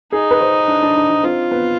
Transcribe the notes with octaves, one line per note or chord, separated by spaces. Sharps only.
D#4 G#4
B4
C5
D4
D4
D4
D4
C4 F4
B3